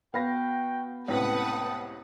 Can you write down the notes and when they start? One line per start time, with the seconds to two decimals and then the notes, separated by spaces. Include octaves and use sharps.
0.14 B3 F#4 B4 F5 G5 A#6
1.08 C#2 A2 C3 B4 F#5 G5 A5 D#6